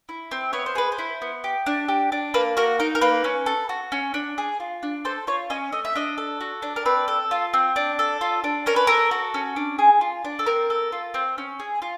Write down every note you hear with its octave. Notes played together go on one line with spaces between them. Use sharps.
E4
C4
B3 C#5
C5
G#4 B4
C5
E4
B3
G4
D4
G4
D4
A#3 B4
F#4 A#4
D#4 A#4
A#4
A#3 B4
C#4
A4
F#4
C#4
D4
G#4
F4
D4
A4 C5
F4 C#5
C#4 D#5
A3 D#5
E5
D4 D#5
A4
F#4
D4
A#4
C4 B4
A4
F4
C4
D4
A4
F4
D4
C#4 A#4
B4
A4 A#4
F#4
C#4
D4
G#4
F4
D4
A4
C4 A#4
A4
F4
C4
C#4
G#4
F4